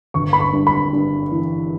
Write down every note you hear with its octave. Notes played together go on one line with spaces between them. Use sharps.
G1 C#6
B5
C#6
G2
B5
G2
E3